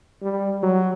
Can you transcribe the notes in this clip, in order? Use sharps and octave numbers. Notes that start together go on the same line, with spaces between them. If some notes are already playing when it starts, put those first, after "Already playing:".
G3
F#3